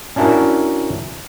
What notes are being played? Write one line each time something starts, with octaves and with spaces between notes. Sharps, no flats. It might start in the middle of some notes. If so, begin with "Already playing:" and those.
C#4 D4 E4 F#4 A#4